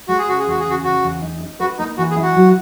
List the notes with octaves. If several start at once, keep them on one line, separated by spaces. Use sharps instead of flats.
G#3 F#4
G#4
C#3 F#4
G#4
E2 F#4
G#4
C#3 F#4
C#3 F#4
E2
D#4
D#4
F#4 B4
A#3 D#4
E3 F#4
G#4
E4
F#4
F#3